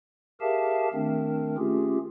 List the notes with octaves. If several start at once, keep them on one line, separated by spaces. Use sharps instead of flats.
G4 G#4 A#4 E5 F5 A5
D#3 A3 C4 D4 A#4
A3 C#4 F4 G4 G#4